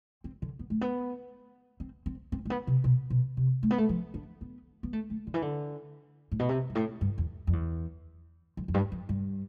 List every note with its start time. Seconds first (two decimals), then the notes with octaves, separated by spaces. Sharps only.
0.24 C4
0.42 D3
0.59 B3
0.70 A3
0.81 B3
1.80 C4
2.06 C4
2.32 C4
2.45 A3
2.50 B3
2.67 C3
2.84 B2
3.10 B2
3.37 C3
3.63 A3
3.71 B3
3.78 A3
3.89 F3
4.14 D4
4.41 B3
4.83 B3
4.93 A3
5.10 A3
5.27 D3
5.34 E3
5.42 D3
6.32 A2
6.39 B2
6.49 C3
6.70 G2
6.75 A2
7.01 G2
7.18 E2
7.47 F2
7.53 E2
8.57 F2
8.68 F2
8.74 G2
8.92 F2
9.09 G2